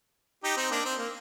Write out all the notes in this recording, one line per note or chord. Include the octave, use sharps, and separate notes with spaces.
D#4 G4
C4 D#4
A#3 D4
C4
A#3